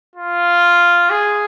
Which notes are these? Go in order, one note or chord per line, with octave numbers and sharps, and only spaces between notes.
F4
G#4